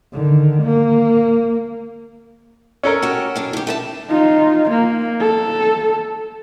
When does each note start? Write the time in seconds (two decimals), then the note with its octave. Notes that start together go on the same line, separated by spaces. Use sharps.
0.13 D3 D#3
0.63 A#3
2.83 C#4 A4 A#4
3.02 F#4 G4
3.36 F#2 D4
3.53 D#3 G4
3.67 A3 A#4 A5
4.09 D#4 F4
4.70 A#3
5.21 A4